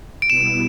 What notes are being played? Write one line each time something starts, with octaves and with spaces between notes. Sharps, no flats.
D7
B2 G3 B3 E4 E7